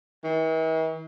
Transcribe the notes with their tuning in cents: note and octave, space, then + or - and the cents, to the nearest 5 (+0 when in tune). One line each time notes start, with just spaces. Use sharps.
E3 -45